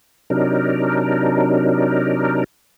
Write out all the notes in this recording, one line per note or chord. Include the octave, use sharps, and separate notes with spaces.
C3 F#3 D4 D#4 A#4